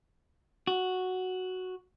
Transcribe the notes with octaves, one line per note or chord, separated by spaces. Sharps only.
F#4